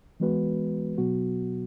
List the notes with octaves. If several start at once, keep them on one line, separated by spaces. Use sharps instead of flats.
E3 G#3 B3 F#4 B4
B2 F#3 B3 F#4